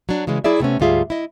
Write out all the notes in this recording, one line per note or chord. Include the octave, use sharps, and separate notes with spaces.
F#3 D4
C#3 E3 G#3 C#4
F#3 E4 G#4 D5 E5
C3 A3 B3 C#4
D2 G#2 G3 F4 G#4 E5
E4 D#5